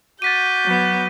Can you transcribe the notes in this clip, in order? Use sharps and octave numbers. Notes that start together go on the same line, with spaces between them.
F#4 D6 G6 A6 B6 D#7
F#3 B3